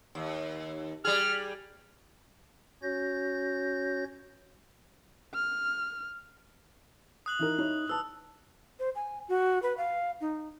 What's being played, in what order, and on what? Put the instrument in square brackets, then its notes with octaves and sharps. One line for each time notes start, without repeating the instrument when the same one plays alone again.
[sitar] D#2
[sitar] G3 G#4 [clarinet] F6
[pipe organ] C#4 F#4 C#5 G6 A#6
[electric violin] F6
[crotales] D#6 F#6 F#7
[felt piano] E3 D#4 A#4
D#4 E4 C#5
[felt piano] B4 A5 [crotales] E6
[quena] C5
G#5
F#4
B4
F5
D#4